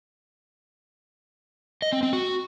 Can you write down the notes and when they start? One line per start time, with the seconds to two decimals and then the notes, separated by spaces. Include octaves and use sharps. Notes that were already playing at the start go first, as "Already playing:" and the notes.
1.82 D#5
1.93 C4
2.03 C4
2.13 F#4